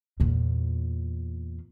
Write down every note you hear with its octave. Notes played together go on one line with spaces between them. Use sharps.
E2 A#2